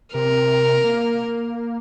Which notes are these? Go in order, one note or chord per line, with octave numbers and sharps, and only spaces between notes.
C3 A#4
A#3